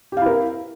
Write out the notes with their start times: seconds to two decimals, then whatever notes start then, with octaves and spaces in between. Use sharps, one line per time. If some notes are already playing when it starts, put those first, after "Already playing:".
0.12 G4
0.17 F5
0.21 E4
0.26 A#4